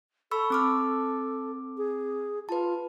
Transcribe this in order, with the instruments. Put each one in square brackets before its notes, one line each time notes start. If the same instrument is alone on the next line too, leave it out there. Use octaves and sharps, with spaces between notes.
[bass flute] A4 [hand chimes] B5 C#6 E6
[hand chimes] C4 D6 F6
[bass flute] G#4
[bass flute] F4 [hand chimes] B4 A5